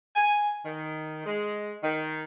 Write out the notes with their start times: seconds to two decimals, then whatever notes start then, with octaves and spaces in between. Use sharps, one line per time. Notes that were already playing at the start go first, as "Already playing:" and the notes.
0.16 G#5
0.65 D#3
1.26 G#3
1.84 D#3